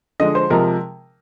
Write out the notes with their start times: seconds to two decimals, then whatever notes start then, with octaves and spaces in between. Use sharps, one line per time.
0.20 D3 F3 G#3 D#5
0.35 C5
0.50 C3 F3 G#3 A#4